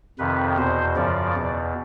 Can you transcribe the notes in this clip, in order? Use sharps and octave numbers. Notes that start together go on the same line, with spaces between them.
F2 C3 D#3 B4
E2 B2 C5
F#2 C#3 F3 D5
E2 B2